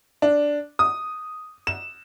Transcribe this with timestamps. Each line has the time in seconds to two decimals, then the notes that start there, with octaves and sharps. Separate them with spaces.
0.22 D4
0.79 D#6
1.67 E7